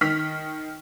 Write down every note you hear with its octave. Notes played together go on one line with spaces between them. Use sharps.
D#3 F6 B6